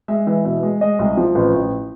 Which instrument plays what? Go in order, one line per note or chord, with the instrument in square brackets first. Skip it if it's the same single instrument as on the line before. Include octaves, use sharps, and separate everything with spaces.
[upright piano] G#3 E5
E3 E5
B2 E5
G#3
G#3 D#5
C2
F3
A1
A1